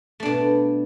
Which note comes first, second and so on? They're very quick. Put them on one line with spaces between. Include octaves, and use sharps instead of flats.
A3 D4 B2